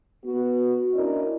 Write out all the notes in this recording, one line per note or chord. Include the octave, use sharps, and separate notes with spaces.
B3 F#4
C#4 D4 E4 A#4 D5 D#5